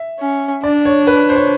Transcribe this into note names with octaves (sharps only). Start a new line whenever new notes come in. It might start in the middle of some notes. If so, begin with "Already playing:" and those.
Already playing: E5
C#4
D4 D5
C#5
B4
C5
C#5